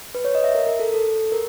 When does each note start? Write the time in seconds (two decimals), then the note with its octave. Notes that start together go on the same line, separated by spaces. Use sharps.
0.15 B4
0.25 C#5
0.35 D#5
0.44 E5
0.55 A#4
0.67 A#4
0.80 A4
0.94 A4
1.32 A#4